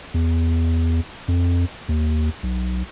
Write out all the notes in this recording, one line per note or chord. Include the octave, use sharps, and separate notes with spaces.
E2
F2
D#2
B1